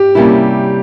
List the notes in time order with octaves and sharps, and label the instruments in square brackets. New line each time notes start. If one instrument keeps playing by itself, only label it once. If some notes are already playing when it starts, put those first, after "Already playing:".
Already playing: [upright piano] G4
[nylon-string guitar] C3 G3 A#3 C#4 E4